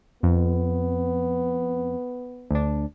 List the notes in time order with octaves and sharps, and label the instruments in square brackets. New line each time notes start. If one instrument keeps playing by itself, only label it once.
[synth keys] F2 [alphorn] B3
[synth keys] D2 D4